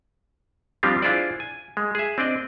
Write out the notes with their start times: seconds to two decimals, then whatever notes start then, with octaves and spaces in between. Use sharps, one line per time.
0.83 F3 G3 C4 D4 F4 G4
1.02 D4 E4 F4 G#4 C5 D5
1.40 G#5
1.77 G#3
1.95 G#4 E5
2.18 C4 D4 D5 D#5